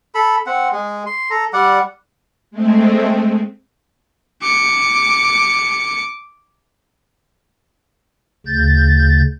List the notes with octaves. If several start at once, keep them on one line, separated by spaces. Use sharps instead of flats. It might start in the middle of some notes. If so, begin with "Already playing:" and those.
A4 B5
C4 F#5
G#3
C6
A4 A#5
G3 D5 F#5
G#3 A3 C4
D6 C#7
D2 C#3 G6 A6